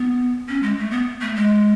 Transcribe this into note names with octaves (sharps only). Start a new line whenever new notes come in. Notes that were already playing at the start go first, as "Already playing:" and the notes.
Already playing: B3
C#4
G#3
A3
B3
A3
G#3